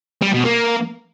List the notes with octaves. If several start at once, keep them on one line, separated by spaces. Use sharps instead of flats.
G3
B2
A#3